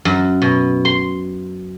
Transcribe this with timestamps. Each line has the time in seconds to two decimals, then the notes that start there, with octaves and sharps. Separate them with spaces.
0.05 F#2
0.42 B2
0.85 C6